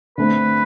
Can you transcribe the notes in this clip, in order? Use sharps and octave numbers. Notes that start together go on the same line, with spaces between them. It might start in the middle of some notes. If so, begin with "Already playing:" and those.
D3 A3 C4 B4